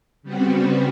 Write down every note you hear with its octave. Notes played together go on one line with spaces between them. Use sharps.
C#3 G3 B3 C4 F#4